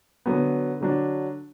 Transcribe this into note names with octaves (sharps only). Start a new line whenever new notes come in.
D3 F#3 B3
D3 F#3 D4